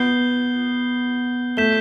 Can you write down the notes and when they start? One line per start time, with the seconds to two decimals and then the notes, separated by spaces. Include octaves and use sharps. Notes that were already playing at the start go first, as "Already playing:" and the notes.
Already playing: B3 G6 C7 G7
1.57 A3 G6 B6 E7 G7